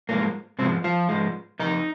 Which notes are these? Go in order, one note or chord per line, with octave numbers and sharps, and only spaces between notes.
G#2 F3 G#3 A#3
G#2 C3 F3 G#3 C4
F3 F4
G#2 F3 G#3
F2 D#3 D#4